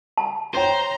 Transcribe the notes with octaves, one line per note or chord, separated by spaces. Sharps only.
A5
C5 C#5 G5 A#5